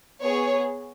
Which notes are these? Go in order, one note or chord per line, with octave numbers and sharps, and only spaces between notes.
B3 G#4 C#5